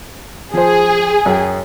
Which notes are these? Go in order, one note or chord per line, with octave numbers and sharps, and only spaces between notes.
F3 G#4 C5
F#2 G5